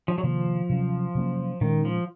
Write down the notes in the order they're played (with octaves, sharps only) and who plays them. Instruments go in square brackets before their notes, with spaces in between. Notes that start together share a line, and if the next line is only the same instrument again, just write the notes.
[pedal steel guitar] F3
F#3
[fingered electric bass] C3 D#3 A#3 [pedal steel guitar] F3
[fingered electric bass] C3 F#3 C#4
C3 F#3 A#3 C#4
[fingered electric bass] A#2 G#3 C#4 [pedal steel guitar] D#3
[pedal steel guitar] F3